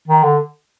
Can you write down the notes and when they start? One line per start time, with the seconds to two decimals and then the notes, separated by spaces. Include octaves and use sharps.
0.08 D#3
0.24 D3